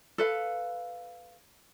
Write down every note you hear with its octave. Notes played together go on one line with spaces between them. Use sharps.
A4 B4 F5